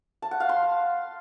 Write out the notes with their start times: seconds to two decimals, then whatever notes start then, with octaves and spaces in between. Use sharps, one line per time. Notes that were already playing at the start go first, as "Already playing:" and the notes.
0.22 A5
0.31 F#5
0.40 F5
0.49 C6